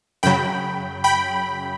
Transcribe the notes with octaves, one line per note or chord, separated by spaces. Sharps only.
F#2 C#3 F#3 G5 B5
G5 B5